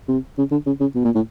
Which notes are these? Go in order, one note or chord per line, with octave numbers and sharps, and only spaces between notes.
C3
C#3
D3
C#3
C#3
B2
A#2
A2